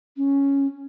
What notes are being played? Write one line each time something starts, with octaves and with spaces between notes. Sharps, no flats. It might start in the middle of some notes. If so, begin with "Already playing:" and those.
C#4